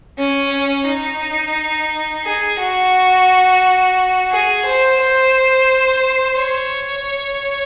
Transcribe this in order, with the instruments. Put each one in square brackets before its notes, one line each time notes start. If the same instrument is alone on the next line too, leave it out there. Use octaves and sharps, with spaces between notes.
[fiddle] C#4
D#4
G#4
F#4
G#4
C5
C5
C#5